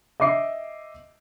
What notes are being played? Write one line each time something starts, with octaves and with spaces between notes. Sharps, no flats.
D#5 E5 D6 C7